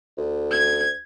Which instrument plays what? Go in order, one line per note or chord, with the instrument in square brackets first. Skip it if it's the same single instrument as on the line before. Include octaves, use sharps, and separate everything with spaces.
[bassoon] D2
[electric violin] G#6